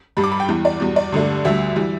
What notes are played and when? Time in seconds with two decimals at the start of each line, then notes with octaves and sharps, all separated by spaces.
0.17 G2 G3 B5
0.24 D6
0.32 B5
0.40 G5
0.49 E2 E3 G3
0.65 D5
0.80 E2 B2 G3
0.96 D5
1.12 G2 D3 A3
1.45 D2 D3 G3 E5
1.76 E3 G3